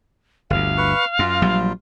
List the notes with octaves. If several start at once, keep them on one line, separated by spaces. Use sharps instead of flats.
G1 D2 F5
B4 C#6
F#2 F4
A#1 F#3 G3